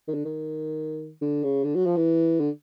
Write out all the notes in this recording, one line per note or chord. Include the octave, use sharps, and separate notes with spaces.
D#3
D3
D#3
D3
C#3
D3
F#3
F3
E3
D3